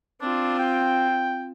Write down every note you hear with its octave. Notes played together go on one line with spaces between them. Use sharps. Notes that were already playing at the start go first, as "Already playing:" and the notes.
C4 D4 F4
G5